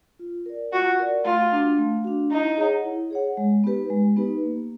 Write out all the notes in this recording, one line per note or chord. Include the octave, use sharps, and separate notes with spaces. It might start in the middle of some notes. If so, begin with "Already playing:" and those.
F4
A#4 D5
F4 F#4
A#4 D5
A3 F4
D4 F#4
A3
D4 F#4
D#4 E4
G#4 C#5 F#5
E4
G#4 C#5 F#5
G#3
B3 D#4 G4 B4
G#3
B3 D#4 G4 B4
A#3